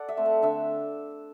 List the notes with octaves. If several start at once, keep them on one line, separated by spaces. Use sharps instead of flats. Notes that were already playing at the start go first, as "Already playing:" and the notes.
Already playing: A4 D5 F#5
E5
A3 C4
F#5
D3 E5